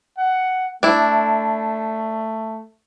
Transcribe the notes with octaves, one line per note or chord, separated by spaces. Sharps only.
F#5
A3 D4 E4